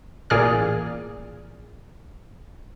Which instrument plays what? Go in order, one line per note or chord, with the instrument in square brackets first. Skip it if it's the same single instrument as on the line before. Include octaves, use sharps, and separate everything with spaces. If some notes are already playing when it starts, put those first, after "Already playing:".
[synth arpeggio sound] A1 A#2 G#4 D5 F6